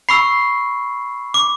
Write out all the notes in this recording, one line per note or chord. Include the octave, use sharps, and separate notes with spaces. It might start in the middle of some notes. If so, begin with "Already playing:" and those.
B5 C#6 E6 C7
D6